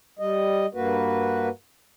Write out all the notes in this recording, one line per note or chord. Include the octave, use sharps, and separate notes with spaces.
G3 D#5
G2 A#3 F#4 B4